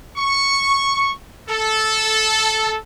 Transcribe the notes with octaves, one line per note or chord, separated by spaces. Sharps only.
C#6
A4